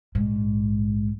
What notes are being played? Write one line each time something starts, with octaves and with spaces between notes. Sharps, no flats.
A#1 G#2